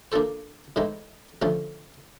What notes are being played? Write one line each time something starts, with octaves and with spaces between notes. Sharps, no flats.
A#3 D4 F4 A4 C5
A2 E3 G#3 C4 D#4
D3 F3 A3 C#4